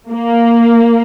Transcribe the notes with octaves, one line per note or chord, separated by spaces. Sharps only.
A#3